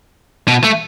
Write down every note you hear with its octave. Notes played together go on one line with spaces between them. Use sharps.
B2
A3